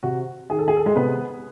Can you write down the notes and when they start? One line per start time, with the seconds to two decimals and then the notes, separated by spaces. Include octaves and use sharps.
0.03 C3 F#4
0.50 D#3 G#4
0.59 A4
0.68 G#4
0.77 A4
0.86 G#3 G#4
0.95 C3 B3 B4